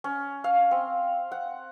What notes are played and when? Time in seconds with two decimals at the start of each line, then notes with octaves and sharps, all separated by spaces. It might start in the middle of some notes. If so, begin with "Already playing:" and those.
0.04 C#4
0.44 F5
0.71 C4
1.32 F#5